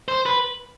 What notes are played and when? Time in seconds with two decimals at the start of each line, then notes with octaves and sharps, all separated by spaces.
0.08 C5
0.26 B4